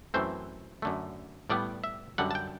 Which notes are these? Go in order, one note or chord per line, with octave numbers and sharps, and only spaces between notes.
F#2 E3 A3 C4 C5
F#2 D3 A3
A2 G3 B3 D5
E5
F#2 D3 G3 F#5
A5
G5